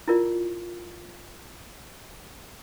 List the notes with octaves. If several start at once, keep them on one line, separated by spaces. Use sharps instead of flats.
E4 F4 A#4 D5